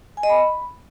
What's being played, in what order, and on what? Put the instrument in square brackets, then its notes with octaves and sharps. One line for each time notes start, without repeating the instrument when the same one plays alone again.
[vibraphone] G#5
D#5
B5